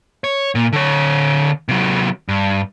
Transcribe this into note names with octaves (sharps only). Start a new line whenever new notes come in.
C#5
A#2
D3 C#5
C3 F#3
G2